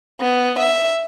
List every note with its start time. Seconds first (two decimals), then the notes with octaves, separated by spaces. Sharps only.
0.20 B3
0.59 E5